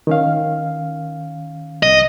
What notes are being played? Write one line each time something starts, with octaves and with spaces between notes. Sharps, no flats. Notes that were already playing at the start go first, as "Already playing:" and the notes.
D#3 C#4 F5
C2 D#5